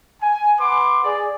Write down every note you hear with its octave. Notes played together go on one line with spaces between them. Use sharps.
G#5
B4 F#5 C6 D6
G#4 D5